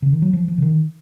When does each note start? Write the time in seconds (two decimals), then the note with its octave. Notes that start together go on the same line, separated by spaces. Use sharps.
0.02 C#3
0.13 D#3
0.22 F#3
0.33 F3
0.48 F3
0.58 C#3
0.62 D#3